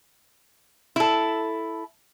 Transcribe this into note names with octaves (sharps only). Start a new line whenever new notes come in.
E4 A4